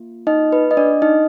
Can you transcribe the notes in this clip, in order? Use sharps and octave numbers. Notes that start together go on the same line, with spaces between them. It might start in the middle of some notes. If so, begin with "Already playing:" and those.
Already playing: A#3 F4
D#4 D#5
B4
D#5
D4 D5
D#4 D#5